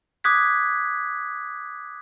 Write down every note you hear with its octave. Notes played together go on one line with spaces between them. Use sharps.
D6 D#6 F#6 G#6 B6